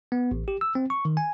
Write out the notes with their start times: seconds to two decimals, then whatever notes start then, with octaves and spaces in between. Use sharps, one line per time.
0.12 B3
0.31 A1
0.48 G4
0.61 E6
0.75 C4
0.90 C#6
1.05 D#3
1.17 G#5